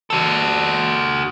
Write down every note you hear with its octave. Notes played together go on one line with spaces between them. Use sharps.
F#4 A4